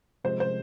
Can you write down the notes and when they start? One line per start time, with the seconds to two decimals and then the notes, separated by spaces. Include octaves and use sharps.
0.24 C3 F3 G#3 C5
0.40 C5